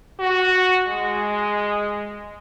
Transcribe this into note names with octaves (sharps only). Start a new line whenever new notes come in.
F#4
G#3